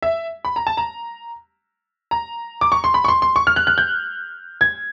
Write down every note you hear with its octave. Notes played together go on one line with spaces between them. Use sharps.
E5
B5
A#5
A5
A#5
A#5
D6
C#6
C6
B5
C#6
C6
C6
C#6
F6
F#6
F#6
G6
G#6